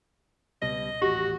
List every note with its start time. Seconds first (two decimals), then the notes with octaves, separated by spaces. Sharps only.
0.62 C#2 B2 G3 D#5
1.02 D#1 A1 F#4 G4